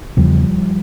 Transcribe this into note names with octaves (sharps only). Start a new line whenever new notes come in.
E2 C#3 F3 G3